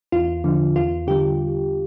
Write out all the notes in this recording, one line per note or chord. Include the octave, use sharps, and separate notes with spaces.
E2 F4
D3 F3
E2 F4
D3 G3 G4